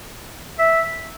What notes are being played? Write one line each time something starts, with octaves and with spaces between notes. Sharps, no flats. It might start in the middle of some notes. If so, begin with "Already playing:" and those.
E5